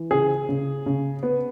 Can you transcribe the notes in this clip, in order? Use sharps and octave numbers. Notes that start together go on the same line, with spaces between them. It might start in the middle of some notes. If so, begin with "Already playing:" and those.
Already playing: E3
C#3 G#4
C#3
C#3
B3